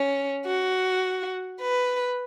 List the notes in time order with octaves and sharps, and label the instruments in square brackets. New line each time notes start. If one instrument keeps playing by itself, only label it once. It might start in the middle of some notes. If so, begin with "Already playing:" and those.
Already playing: [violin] C#4
F#4
B4